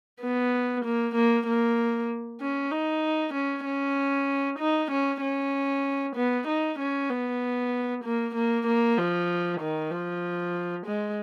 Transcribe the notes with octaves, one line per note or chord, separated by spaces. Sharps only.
B3
A#3
A#3
A#3
C#4
D#4
C#4
C#4
D#4
C#4
C#4
B3
D#4
C#4
B3
A#3
A#3
A#3
F3
D#3
F3
G#3